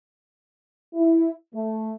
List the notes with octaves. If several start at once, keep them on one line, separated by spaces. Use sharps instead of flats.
E4
A3